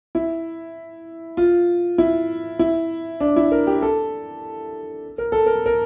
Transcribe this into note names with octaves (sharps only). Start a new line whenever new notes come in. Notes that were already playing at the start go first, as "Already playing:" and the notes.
E4
F4
E4
E4
D4
E4
A#4
G4
A4
A#4
A4
A#4
A#4